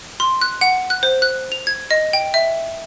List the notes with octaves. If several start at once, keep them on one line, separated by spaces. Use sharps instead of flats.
C6
F#6
F#5
F#6
C5
F#6
F7
G#6
D#5
G5
E5